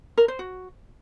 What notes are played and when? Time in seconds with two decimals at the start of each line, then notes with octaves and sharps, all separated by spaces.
0.17 A#4
0.28 C5
0.39 F#4